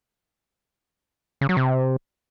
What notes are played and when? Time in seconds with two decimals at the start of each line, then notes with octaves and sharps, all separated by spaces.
1.41 C#3
1.49 F#3
1.57 C3